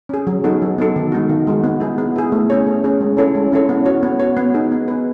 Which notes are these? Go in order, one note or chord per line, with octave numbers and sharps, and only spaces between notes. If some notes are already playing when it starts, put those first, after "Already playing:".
C#4 G#4
F#3
B3 D#4 F#4 A4
F#3
B3 D#4 F#4 A4
D#3
G#3 D#4 F#4
D#3
G#3 D#4 F#4
B3
E4 G#4
B3
E4 G#4
A3
C#4 G#4 C#5
A3
C#4 G#4 C#5
G#3
C#4 E4 A4 C#5
G#3
C#4 E4 A4 C#5
B3
F#4 C#5
B3
F#4 C#5
B3
D#4 G#4 B4
B3
D#4 G#4 B4